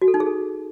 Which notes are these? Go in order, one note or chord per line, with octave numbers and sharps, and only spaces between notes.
F#4
A4
D#4
G#4
A4